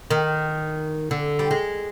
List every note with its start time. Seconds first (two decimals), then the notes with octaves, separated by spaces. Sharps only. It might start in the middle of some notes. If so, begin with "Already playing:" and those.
0.11 D#3
1.11 D3
1.39 G3
1.51 G#3